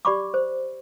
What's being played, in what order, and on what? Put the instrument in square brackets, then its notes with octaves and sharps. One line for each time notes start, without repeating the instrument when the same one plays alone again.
[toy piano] G4 D5 B5 C#6 D6
C5